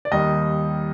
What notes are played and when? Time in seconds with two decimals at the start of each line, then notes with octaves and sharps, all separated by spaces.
0.05 D5
0.11 D#2 D#3 G3 D#5